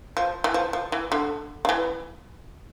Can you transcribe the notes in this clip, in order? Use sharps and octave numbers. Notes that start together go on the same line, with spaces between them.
F3
E3
F3
F3
E3
D3
D3
E3